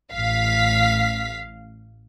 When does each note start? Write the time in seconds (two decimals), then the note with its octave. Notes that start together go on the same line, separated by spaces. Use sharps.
0.12 A1 F5 B6